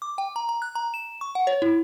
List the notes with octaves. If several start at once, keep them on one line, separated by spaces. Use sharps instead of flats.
D6
G5
A#5
A#5
F#6
A#5
E7
C#6
F#5
C#5
E4